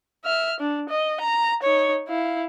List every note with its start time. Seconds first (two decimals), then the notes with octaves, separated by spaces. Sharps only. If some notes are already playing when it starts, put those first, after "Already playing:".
0.25 E5 F6
0.60 D4
0.89 D#5
1.21 A#5
1.63 D#4 C#5
2.08 E4 F5